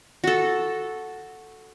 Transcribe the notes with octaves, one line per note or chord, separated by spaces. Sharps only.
F#4 A4